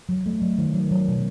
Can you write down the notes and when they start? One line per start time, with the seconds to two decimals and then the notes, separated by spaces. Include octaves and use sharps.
0.09 F#3
0.26 A3
0.42 F#3
0.58 D#3
0.74 F#3
0.92 F#3
1.08 B2